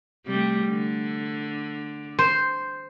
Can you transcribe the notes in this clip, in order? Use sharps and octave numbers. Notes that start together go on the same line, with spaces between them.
C3 G3 A3
D3
C5